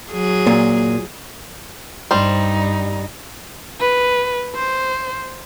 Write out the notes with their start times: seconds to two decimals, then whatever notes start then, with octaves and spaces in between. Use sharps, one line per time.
0.12 F#3 G#4
0.47 A#2
2.11 G2 G3 D#4 C5
3.80 B4
4.55 C5